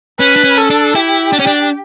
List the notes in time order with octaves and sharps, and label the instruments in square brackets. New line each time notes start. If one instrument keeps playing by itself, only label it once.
[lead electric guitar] C#4 [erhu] B4
[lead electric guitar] D4
C#4
[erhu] A4
[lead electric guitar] D4
[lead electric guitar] E4 [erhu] G4
[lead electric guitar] D4
C#4
D4